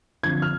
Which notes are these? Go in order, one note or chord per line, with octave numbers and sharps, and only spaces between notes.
D3 F3 C4 G#6
F6